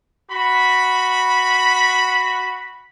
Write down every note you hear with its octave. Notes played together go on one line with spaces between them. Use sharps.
F#4 B5